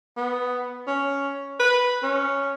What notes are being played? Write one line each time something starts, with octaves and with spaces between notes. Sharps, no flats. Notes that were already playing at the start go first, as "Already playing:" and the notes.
B3
C#4
B4
C#4